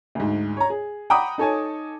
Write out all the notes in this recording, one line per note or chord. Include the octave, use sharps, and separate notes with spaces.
D2 G#2
C#5 A#5
G#4
F#5 G5 A#5 B5 D6 D#6
D#4 A4 C#5 G#5 A5